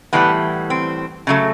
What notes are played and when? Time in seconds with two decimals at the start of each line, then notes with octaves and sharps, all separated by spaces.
0.13 A2 E3 G3 B3
0.70 C4
1.27 C#3 F#3 A3